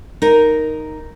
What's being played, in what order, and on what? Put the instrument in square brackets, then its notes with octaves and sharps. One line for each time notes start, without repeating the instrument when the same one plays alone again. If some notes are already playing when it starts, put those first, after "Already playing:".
[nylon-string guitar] D#4 A#4